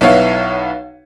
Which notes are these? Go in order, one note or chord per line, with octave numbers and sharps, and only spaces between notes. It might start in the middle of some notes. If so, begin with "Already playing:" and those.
B1 B3 E4 C#5 F5